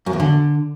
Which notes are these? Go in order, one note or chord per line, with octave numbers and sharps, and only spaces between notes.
F#2
E2
D3